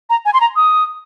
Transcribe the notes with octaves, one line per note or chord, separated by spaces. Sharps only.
A#5
G#5
C6
A#5
D#6